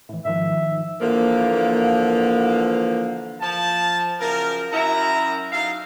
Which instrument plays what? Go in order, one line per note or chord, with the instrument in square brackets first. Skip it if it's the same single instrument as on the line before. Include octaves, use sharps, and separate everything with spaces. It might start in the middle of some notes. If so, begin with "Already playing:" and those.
[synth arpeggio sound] A2 E3
[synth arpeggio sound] G#2 D#3 F3 [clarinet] E5
[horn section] D3 E3 F3 A#3
F3 A5
F#2 C#3 F3 A#4
F#2 E4 A#5
F#3 D#4 A4 F5